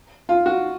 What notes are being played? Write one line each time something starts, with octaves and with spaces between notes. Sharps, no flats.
F4
F#4